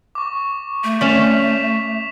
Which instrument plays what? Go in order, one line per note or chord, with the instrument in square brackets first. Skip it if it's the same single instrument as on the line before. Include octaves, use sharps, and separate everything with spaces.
[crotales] C#6 D6
[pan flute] A3
[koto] C#4 D5 [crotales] B6 E7 F7